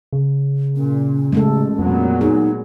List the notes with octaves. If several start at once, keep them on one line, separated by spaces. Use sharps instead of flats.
C#3
A#2 C#4
A1 G#3 A3 A4
F2 A#2 F#3 B3
D#4 G#4